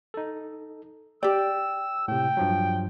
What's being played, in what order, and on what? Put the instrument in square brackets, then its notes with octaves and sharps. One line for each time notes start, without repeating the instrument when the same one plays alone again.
[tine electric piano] D#4 A4
[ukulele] G4 D5 [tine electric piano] G5 [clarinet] E6
[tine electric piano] A2 C3 [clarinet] G5
[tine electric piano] G2 F3 F#3